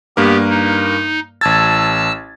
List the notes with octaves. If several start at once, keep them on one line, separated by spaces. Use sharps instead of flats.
G2 A#3 B3 G4 A#4
D#4
A1 A5 E6 G#6 A6